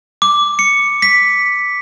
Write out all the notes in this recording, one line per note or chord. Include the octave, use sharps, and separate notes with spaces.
D6
C#7
B6